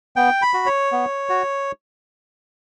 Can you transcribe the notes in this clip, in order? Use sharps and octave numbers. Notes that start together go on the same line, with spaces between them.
B3 G5
B5
F#4
C#5
B3
F#4